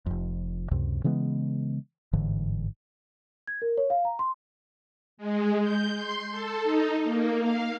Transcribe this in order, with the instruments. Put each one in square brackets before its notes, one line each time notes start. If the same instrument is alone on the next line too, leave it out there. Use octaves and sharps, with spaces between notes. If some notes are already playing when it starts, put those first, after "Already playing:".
[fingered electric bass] F1 F2
C#2 F#2 C3
C#3 E3 G#3 B3
G1 G#2 D3 E3
[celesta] G#6
A#4
C#5
F5
A#5
C6
[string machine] G#3
G6
C6
A4
D#4
A#3
F5